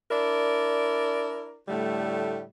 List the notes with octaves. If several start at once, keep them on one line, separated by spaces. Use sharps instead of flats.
D4 E4 A#4 D5
A2 D3 G3 A3